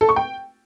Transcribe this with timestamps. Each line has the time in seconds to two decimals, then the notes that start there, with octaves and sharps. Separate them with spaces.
0.01 A4
0.09 C#6
0.16 G5